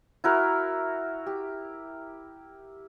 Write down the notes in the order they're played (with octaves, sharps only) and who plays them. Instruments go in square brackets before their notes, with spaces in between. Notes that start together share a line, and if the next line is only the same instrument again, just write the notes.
[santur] E4 F#4 A#4
G4